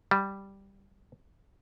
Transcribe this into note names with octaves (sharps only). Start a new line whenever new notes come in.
G3